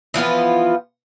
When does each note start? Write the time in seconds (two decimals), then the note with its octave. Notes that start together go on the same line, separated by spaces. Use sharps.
0.14 E3 F3 B3 F4